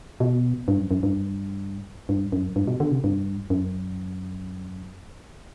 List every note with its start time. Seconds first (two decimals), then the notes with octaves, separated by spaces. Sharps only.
0.20 B2
0.68 G2
0.79 F#2
0.91 F#2
1.03 G2
2.09 G2
2.32 F#2
2.56 G2
2.67 B2
2.80 D3
2.91 C3
3.04 G2
3.50 F#2